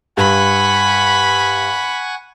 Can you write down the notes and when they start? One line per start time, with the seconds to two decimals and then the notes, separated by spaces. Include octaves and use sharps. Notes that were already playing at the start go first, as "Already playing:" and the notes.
0.17 G2 F#5 G#5 B5 C#6